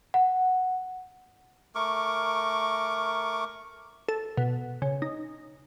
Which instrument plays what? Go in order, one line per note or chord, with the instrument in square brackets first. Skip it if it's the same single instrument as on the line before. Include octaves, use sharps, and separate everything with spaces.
[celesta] F#5
[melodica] A3 A#4 C#6 D6
[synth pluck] A4
B2
C#3
D#4